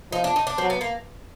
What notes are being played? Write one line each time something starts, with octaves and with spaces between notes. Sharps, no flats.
F3 D#4
D4
D#4
D4
F#3 C4
B3
A#3